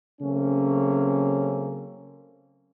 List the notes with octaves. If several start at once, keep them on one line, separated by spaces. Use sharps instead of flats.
C#3 F#3 A3 A#3 C4 C#4